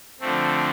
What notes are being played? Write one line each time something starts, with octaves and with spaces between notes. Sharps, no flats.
D3 F3 A3 C4